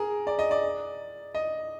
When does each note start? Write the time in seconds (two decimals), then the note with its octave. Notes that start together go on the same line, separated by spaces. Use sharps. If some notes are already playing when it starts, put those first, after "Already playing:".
Already playing: G#4 A#4
0.27 D5
0.39 D#5
0.51 D5
1.35 D#5